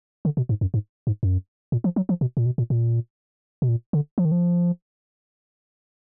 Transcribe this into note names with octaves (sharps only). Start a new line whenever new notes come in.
D3
B2
G#2
F#2
G#2
G#2
F#2
A#2
F3
F#3
F3
B2
A#2
B2
A#2
A#2
B2
A#2
D3
F3
D#3
F3